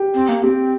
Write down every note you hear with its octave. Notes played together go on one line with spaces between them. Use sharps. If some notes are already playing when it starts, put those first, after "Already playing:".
Already playing: G4
C4
A#3
C4 G4